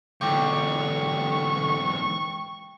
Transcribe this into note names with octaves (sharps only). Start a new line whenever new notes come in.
E2 G#2 D3 G5 C#6 D6